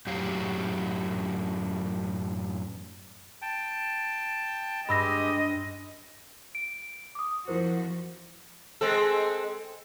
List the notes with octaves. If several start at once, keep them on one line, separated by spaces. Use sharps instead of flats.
F#2 A2 F#3 G4 F5
G5 A5
G2 G#3 G4 D#5 B5 E6 A#6
D7
D6 D#6
F2 F3 E4 F#4 A#4 C5
G#3 C4 A4